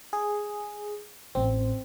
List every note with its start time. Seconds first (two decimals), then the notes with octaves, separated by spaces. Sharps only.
0.13 G#4
1.35 A1 C4